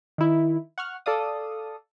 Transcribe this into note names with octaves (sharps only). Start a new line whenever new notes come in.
D#3 E4
F#5 C#6 F6
A4 D5 F5 D#6